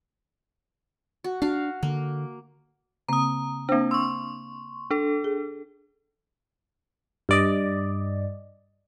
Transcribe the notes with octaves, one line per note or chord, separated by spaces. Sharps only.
F#4
D4 F#4 F5
D3 A#3
C#3 A#3 C4 A#5 D#6
A#3 C4 D4 C5
C6 C#6 E6
D4 A4
G#4
G2 D5 D#5